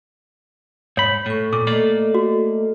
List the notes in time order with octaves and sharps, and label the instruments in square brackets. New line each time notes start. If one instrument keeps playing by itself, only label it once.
[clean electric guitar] G#2 B5 [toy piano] C#5
[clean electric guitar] A2 [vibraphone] A4 C#6
[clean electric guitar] A#2 [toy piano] D6
[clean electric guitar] A3 A#3 D5 [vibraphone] A4 D#5
[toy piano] F#4